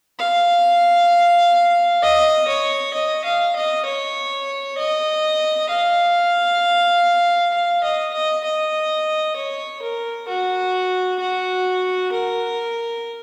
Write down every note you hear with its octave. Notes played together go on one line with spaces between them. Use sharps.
F5
D#5
C#5
D#5
F5
D#5
C#5
D#5
F5
F5
D#5
D#5
D#5
C#5
A#4
F#4
F#4
A#4